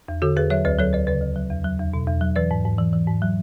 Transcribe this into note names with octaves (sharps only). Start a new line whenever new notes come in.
E2
D3 F#4 A4
E2 G#4 B4
F#3 C#5 E5
D2 B4 D5
F#3 A4 C#5
D2 B4 D5
C#3 B4 D5
D2
F#3
E2
F#3
E2
B2
E2
F#3
E3 B4 D5
G#2
G#2
E3
E3
G#2
F#3